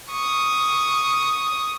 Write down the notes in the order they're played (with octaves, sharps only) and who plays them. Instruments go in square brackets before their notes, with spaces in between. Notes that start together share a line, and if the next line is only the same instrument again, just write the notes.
[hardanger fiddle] C#6 D#6